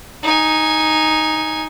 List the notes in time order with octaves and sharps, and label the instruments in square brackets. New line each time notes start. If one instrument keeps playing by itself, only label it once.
[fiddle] D#4 G#5